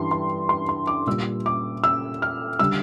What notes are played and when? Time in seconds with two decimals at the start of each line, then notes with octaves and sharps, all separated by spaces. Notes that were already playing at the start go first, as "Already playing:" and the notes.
Already playing: G2 E3 G3 C6
0.11 C6
0.49 C6
0.69 C6
0.87 D6
1.06 A#2 G3 E6
1.46 D6
1.84 E6
2.22 F6
2.59 D3 G3 E6